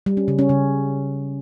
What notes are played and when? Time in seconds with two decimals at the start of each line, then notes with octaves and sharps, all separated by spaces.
0.06 G3
0.17 C#4
0.28 C#3
0.39 C#4
0.49 C#3